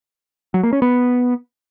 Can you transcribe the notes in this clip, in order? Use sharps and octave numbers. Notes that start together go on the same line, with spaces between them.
F#3
A#3
C#4
B3